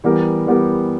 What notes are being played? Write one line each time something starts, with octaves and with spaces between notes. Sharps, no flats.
E3 G3 B3 G4 A#4
E3 G3 B3 G4 A#4